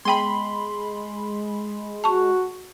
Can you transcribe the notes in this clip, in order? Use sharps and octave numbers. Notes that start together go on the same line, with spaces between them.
G#3 B3 G5 B5 C6
F#4 A5 C#6